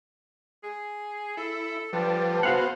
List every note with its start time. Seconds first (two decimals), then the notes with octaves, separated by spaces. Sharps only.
0.63 G#4
1.37 E4 A4
1.93 D3 F3 G3 B4 A5
2.43 B3 F#4 G#4 C5 F5 F#5